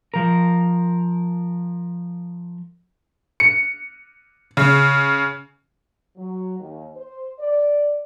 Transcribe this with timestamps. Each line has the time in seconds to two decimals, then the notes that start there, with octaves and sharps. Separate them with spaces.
0.14 F3 A#4
3.40 C#7
4.57 C#3
6.17 F#3
6.59 D#2
6.96 C5
7.39 D5